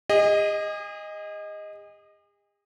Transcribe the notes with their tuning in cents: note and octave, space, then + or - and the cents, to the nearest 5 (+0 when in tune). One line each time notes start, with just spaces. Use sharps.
G#4 -40 D#5 +0